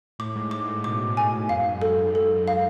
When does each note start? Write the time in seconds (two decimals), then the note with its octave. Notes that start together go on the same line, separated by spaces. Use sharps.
0.19 A2 D6
0.36 G#2
0.51 G#2 D6
0.68 A2
0.84 B2 D6
1.06 A2
1.17 G#5
1.28 G#2
1.49 F#2 F5
1.59 G#2
1.68 F#2
1.78 G#2 A4
1.87 F#2
1.97 G#2
2.07 F#2
2.15 G#2 A4
2.26 F#2
2.36 G#2
2.48 F5